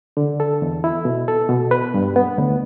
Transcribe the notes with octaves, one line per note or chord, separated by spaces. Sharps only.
D3
A4
E2
E4
B2
A4
B2
B4
G2
B3
D2